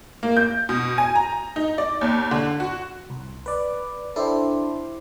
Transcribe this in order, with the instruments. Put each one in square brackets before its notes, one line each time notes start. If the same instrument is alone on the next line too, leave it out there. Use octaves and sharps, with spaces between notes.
[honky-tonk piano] A#3
G6
B2
G#5
A#5
D#4
D5
D#2
D3
F#4
[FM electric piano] C2
B4 D5
[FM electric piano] D4 A4 [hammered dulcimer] E4 G4 C5